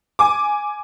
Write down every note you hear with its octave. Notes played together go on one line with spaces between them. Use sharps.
G#5 D6